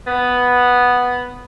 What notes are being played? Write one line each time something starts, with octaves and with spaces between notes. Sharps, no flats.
B3